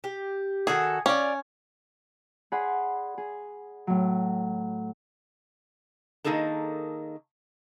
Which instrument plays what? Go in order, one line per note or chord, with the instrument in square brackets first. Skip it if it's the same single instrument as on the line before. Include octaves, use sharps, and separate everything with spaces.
[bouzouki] G4
[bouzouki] D#3 F#4 A4 [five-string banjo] G#4
[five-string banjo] C#4 [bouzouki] F4 D5
[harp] G#4 D5 F#5 B5 C6
G#4
A2 F#3
[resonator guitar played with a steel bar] D#3 A#3 D#4 G#4 A4 A5